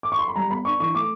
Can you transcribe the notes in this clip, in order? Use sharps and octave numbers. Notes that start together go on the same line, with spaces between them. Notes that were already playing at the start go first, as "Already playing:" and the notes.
D6
C#6
C6
B5
G3 A#5
B3 B5
D4 C#6
E3 C#6
A3 D6